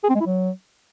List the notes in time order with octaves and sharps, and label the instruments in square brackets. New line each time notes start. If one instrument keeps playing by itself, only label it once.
[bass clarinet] G#4
C4
G#3
E4
F#3